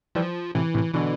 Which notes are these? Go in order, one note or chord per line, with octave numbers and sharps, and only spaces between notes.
E3 F3 G3
A2 C3 E3
A2 C3
B2 D3 E3